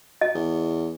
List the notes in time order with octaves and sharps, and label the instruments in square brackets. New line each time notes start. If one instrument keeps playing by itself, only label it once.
[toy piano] D#5
[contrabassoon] E2